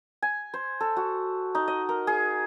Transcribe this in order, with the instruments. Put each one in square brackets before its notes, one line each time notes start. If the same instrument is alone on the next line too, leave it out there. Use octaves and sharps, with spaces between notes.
[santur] G#5
C5
A4
F#4
D#4
D#5
A#4
G#4